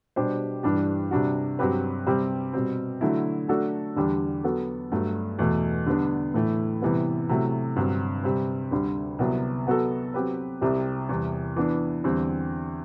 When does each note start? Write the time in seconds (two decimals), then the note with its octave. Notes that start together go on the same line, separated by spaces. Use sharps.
0.16 B2 G3 D4 G4 C5
0.63 G2 E3 G3 D4 G4
1.11 C3 G3 D4 F#4
1.59 G2 F#3 C4 G4 B4
2.06 C3 G3 C4 G4
2.53 B2 G3 C4
3.01 D3 F#3 A3 E4
3.48 F#3 A3 D4 F#4 A4
3.96 E2 D3 G3 D4 G4
4.44 F#3 B3 F#4 A4
4.92 G2 F#3 A3
5.39 E2 B2 A3
5.86 D3 G3 B3 D4
6.34 A2 E3 A3 E4
6.82 C3 E3 G3 B3
7.29 C3 F#3 A3 E4
7.76 G2 D3 F#3 C4
8.24 C3 G3 C4
8.71 D2 D3 G3
9.19 C2 C3 F#3 B3
9.67 F#3 B3 F#4 A4
10.14 F#3 C4 G4 B4
10.61 C2 C3 G3 C4 G4
11.09 E2 C3 G3
11.56 E3 B3 D4
12.04 E2 D3 G3 C4